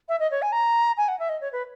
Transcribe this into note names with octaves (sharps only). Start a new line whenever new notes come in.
E5
D#5
C#5
G#5
A#5
G#5
F#5
E5
D#5
C#5
B4